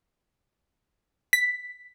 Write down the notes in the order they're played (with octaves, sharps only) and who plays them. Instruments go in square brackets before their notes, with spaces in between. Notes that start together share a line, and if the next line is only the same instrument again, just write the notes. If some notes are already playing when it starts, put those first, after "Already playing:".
[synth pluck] B6